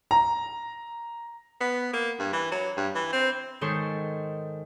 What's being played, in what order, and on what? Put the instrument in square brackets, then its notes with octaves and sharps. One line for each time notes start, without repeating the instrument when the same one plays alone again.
[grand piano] A#5
[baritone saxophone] B3
A#3
G2
E3
F#3
G2
E3
C4
[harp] G#2 D#3 A4 C5 C#5 C6